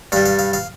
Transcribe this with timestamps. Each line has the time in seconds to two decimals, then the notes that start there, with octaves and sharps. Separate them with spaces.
0.12 G2 G3 F5
0.26 F5
0.39 F5
0.53 F5